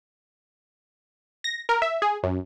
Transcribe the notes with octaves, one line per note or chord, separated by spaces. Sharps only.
A#6
A#4
E5
G#4
F#2